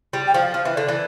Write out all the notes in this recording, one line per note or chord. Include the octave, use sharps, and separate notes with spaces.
G3
G5
F3
F5
F3 F5
E3 E5
D5
D3
E3 D5